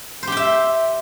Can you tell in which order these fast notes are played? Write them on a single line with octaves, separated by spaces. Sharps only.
C5 G4 G5 E5